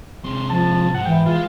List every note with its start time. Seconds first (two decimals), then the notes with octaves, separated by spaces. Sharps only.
0.25 C3 G#3 C6
0.50 F3 A5
0.94 G#2 F#5
1.06 E3 G5
1.26 G#3 F4